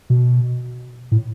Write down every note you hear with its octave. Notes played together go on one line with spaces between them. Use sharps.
B2
A2